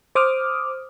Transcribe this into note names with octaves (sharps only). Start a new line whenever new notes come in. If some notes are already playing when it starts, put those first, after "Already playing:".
C5 D6 D#6 F6